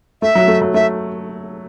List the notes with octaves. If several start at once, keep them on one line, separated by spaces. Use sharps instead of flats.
A3 E5
F#3
A3
F#3
A3 E5